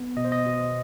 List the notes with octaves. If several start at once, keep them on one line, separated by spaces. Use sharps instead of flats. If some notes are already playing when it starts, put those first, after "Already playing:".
Already playing: B3
B2 D#5
C5
D#5
B2